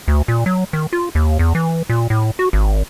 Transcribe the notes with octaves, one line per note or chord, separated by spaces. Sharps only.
D2
A#2
F#3
D#3
F4
D#2
E2
E3
A#2
A2
F#4
G#1